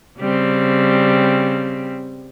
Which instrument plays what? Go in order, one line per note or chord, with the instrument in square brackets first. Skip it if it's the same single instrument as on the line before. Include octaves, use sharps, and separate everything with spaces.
[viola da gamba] C#3 G3 C4